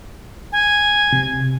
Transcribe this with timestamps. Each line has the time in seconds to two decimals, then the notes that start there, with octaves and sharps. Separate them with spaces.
0.52 G#5
1.13 C3